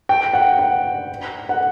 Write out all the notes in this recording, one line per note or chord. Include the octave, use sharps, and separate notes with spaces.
G5
F#5
F#5
F#5